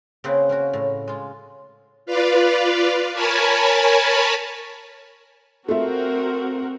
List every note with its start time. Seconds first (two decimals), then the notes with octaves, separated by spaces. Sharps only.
0.24 C#3 A#3 C4 G#4 B4 F#5
0.49 A#3 C#4 F#4
0.73 A2
1.08 G#3 F4
2.06 F4 B4 D5 F5
3.13 A#4 C#5 G#5 A5 B5
5.68 A3 C4 F4 F#4 A#4 E5